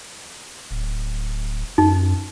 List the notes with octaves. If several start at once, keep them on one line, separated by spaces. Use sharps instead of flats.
D1
F#2 D#4